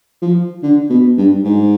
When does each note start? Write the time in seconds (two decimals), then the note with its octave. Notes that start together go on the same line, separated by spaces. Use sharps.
0.22 F3
0.63 D3
0.90 B2
1.18 G2
1.44 G#2